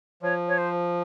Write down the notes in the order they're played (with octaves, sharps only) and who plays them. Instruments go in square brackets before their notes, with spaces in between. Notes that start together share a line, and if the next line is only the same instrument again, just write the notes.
[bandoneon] F3 [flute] C#5
[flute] C#5
C5